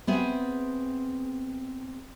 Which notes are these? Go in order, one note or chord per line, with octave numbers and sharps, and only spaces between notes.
B3 C4 G#4 E5